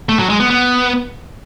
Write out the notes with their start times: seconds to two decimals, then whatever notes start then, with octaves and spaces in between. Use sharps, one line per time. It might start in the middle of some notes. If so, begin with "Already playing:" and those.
0.09 A3
0.19 F#3
0.30 G#3
0.40 B3
0.50 B3